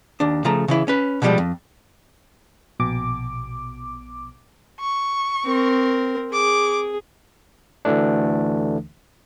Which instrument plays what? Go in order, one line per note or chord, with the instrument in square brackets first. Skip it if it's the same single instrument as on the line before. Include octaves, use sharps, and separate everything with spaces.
[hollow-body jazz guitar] D#2 D4
C#3 F3 A3 A#5
C#3 E3 E4
C#4 B4
B2 D3 F3 G3 G#3
F2
[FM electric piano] A#1 B2 D6
[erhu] C#6
[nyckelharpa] C4 A#4
[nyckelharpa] G#4 [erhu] D6
[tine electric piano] D2 D3 E3 A3 D4